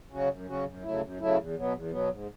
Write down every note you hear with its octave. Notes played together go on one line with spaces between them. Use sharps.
C#3 F#3 C#4 F#4
F#2
C#3 F#3 C#4 F#4
F#2
C#3 F#3 A3 E4
F#2
C#3 F#3 A3 E4
E2
B2 F#3 B3
E2
B2 F#3 B3
G#2